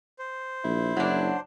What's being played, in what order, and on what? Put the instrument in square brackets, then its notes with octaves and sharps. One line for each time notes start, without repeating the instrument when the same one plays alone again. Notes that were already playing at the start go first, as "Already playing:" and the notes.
[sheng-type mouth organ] C5
[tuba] A#1 [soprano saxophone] E4
[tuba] F#1 [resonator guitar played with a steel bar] F#3 D4